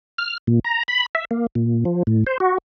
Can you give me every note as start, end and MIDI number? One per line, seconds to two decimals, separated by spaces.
0.18 0.37 89
0.47 0.60 46
0.65 0.83 82
0.88 1.06 83
1.15 1.25 76
1.31 1.47 58
1.55 1.84 46
1.85 2.03 53
2.07 2.24 45
2.27 2.38 72
2.40 2.58 66